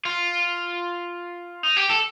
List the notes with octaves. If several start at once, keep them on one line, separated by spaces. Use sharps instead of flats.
F4
D#4
G4
A4